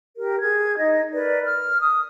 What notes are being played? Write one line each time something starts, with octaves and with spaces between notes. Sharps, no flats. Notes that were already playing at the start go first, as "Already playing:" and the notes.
G4 A#4
G#4 G#6
D#4 D#5
A#4 B4 D5
F6
D#6